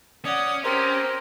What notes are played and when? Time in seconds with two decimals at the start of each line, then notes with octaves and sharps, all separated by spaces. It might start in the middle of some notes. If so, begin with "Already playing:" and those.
0.25 C#4 D5 F#5 D#6
0.64 C4 G4 A#4 C5